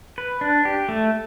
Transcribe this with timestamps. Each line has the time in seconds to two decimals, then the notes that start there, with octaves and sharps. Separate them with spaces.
0.18 B4
0.41 D4
0.65 G4
0.89 A3